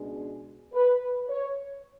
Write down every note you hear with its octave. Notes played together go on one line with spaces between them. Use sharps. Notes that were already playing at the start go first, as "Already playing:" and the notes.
Already playing: C#2 B2 G#3 D4
B4
C#5